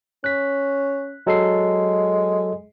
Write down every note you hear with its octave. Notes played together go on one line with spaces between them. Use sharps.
C#4 F#6 B6
F#3 G#3 A4 C7